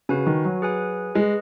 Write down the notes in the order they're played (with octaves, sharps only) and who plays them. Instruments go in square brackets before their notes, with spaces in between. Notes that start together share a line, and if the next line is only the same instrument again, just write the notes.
[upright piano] C#3 [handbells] F#4 B4 G#5
[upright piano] D#3
F#3
[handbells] G#4 B4 G#5
[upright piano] G#3 [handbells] G#4 B4 D#5